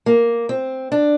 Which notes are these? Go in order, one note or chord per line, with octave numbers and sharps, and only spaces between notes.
A#3
C4
D4